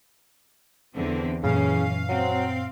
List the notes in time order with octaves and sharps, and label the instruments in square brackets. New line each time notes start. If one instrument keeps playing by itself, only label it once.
[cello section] E2 D3 C4
[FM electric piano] F#2 A#2 [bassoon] C#3 [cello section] E3 C#4 [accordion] F5
[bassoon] F#3 [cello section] C4